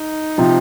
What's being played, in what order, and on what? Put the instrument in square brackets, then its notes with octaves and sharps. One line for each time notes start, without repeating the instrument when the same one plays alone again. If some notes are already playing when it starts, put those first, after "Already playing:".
Already playing: [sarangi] D#4
[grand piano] C3 F3